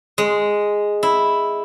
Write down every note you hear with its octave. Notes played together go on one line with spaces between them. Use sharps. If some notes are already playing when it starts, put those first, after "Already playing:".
G#3
E4